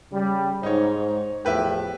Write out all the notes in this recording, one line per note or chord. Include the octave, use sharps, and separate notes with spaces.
C#3 G3
G#2 D#4 C5 C#5
E2 A2 F3 G4 B4 E5